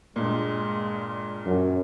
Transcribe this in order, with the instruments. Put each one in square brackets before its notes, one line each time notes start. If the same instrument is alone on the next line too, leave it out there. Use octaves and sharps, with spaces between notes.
[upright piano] G2 A#2 [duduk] G#3
[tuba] F#2